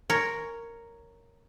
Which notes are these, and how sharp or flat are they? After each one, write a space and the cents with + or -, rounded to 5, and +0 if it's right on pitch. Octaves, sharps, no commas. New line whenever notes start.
A#4 -5 C#5 +5